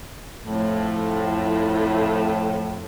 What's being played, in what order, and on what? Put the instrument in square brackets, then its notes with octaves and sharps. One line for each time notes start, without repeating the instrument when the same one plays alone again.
[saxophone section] F2 A2